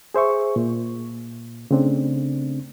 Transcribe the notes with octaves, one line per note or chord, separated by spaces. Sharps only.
G#4 C5 E5 C#6
A#2
C#3 A3 C4 D4